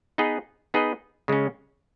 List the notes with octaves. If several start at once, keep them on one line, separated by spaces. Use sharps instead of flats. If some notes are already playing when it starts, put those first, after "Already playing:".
B3 D#4 G#4 B4 D#5
B3 D#4 G#4 B4 D#5
C#3 G#3 C#4